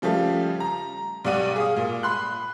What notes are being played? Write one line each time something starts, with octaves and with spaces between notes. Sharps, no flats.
C#3 F3 G3 A3 A4
A#5
B1 G3 D5 F#5 D6 D#7
G#4 F5 D#6
A#2
B5 C6 F#6